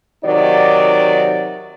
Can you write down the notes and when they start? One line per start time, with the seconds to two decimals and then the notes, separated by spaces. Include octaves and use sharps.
0.24 C3 D#3 F#3 D#4 D5